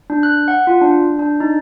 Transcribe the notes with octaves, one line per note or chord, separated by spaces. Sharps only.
D4
F#6
F#5
F4
D4
D4
D#4